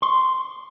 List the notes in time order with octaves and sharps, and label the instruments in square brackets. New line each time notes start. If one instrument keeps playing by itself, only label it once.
[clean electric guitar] C6